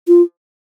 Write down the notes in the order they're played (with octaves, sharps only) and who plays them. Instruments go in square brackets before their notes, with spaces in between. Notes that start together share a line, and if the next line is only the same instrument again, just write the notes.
[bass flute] F4